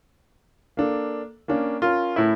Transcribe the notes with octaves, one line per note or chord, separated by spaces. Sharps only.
A#3 D4 A4
A#3 C#4 D4
C#4 F4 A#4
A2 E4